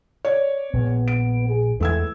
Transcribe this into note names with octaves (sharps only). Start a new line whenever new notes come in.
C#5 D5
A#1 B3
D7
G#4
E2 E3 G#3 A3 E6 G#6